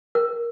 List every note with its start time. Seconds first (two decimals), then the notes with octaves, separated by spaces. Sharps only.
0.15 A#4